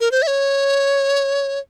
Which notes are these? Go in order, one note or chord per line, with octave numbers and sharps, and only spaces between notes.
A#4
C5
E5
C#5